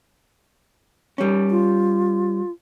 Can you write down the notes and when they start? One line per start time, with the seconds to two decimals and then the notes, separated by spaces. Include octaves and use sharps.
1.18 G3 C#4
1.51 F4